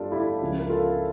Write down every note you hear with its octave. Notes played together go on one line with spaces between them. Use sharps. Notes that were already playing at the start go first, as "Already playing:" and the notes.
Already playing: G1 G3 D4 F4 G4 A4
E4 G4
C#2 C#3 F3
A#4
F4 A4